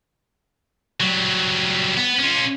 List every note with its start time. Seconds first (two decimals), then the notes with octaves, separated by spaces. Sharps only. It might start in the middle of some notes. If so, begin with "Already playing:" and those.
1.01 F#3 G3
1.97 B3
2.19 C#4 F4